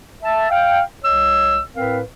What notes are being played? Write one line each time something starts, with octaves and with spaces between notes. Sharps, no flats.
E5 A5
F5 G5
C2 C#5 D#5 E6
A2 C4 A#4 B4 F5